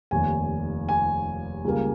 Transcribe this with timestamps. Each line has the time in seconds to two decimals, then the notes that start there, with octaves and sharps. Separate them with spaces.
0.11 F1 D#2 D#3 G#5
0.89 G#5
1.64 C#2 C#3 G3 A#3